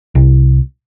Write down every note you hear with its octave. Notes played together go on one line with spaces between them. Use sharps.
C2